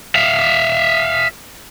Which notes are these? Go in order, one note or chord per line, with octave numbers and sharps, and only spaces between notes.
E5 F5